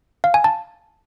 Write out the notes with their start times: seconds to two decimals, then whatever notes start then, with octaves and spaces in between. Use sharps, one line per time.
0.24 F5
0.34 G#5
0.44 A5